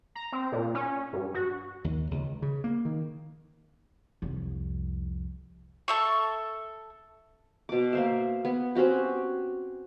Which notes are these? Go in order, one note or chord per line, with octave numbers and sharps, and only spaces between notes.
A#5
C4
A#2
C#4
G2
F#4
D#2
C#2
C#3
A#3
D#3
C2 F2
A4 E5 C#6
B2 D6
A#3 C5 E5
B3
C4 C#4 F#4 G4